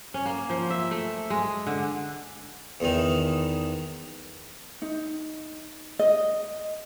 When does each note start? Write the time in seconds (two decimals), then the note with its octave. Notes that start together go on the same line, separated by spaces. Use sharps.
0.14 C#4
0.26 A#3
0.50 F3
0.70 E5
0.91 A3
1.30 G#3
1.67 D3
2.80 E2 D#3
4.82 D#4
5.99 D#5